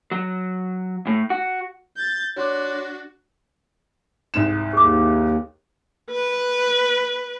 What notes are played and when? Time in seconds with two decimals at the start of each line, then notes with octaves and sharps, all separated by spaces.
0.11 F#3
1.07 A2
1.30 F#4
1.97 G6 A6
2.36 D4 F#4 C#5 C6 D6
4.34 C2 G#2 E7
4.73 D#2 G#4 D6
6.11 B4